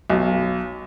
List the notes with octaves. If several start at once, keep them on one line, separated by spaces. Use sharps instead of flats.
B1